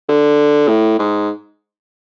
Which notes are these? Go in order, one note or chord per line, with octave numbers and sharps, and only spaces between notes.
D3
A2
G#2